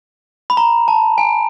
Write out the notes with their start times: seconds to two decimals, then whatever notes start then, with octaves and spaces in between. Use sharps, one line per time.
0.50 B5
0.57 A#5
0.88 A5
1.18 G#5